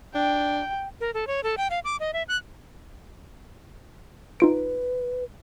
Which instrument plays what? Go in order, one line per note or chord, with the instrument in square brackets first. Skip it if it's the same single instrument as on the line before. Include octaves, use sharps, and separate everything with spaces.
[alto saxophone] D4 [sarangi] G5
[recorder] A#4
A4
C#5
A4
G5
F5
D6
D#5
E5
F#6
[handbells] D#4 F4 D7 [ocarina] B4